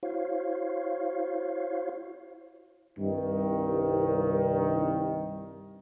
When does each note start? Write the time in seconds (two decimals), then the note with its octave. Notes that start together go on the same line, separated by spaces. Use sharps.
0.03 E4 F#4 C5 C#5 F5
2.99 C2 G2 D#3